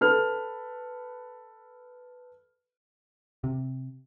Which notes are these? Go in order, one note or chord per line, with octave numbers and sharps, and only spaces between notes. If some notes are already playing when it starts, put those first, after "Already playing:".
A4 B4 F6
C3